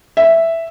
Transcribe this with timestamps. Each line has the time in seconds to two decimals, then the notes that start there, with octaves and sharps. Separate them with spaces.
0.17 E5